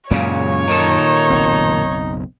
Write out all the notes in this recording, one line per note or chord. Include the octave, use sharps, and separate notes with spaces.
C#2 F#2 A#2 C#3 C#4 C#5
A#2 D#3 D#4 A4
F#1 B1 C4